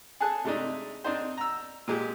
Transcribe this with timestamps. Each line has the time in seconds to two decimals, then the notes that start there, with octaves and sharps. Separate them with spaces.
0.20 G#4 A4 G#5 A5 F#6
0.44 C3 G#3 A3 D4 D#4
1.04 C4 D4 D#4 C5
1.38 A#5 E6
1.88 A#2 G#3 G4